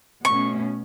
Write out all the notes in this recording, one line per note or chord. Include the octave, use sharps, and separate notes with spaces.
B2 A3 C#4 C#6